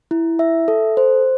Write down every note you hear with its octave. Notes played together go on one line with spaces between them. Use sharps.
E4
E5
A4
C5